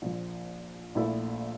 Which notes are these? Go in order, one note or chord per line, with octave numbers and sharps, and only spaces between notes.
A#1 A#2 F3
A#1 A#2 A3 E4 A4